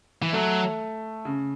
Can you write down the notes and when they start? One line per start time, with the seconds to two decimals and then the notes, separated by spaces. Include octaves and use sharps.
0.22 E3
0.33 F#3 A3
1.25 C#3